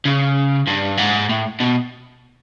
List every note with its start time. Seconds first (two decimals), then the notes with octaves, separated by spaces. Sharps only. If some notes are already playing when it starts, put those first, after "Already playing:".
0.05 C#3
0.67 G2
0.98 G#2
1.29 A2
1.60 B2